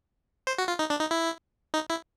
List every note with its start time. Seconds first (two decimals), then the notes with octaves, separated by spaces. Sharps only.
0.47 C5
0.58 F#4
0.68 F4
0.79 D#4
0.90 D4
1.00 D#4
1.11 E4
1.74 D#4
1.90 E4